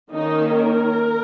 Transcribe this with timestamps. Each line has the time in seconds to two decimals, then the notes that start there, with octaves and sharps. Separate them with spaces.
0.11 D#3 A#3 C#4 D#4
0.54 A#4